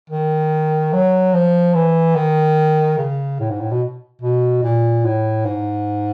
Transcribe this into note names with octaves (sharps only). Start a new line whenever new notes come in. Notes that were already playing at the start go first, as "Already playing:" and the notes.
D#3
F#3
F3
E3
D#3
C#3
A2
G#2
A2
B2
B2
A#2
A2
G#2